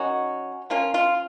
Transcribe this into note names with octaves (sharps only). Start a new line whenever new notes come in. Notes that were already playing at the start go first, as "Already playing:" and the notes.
Already playing: D#3 C#4 D#4 F#4
F3 A#3 C#4 F4
F4